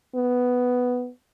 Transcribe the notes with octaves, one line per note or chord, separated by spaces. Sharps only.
B3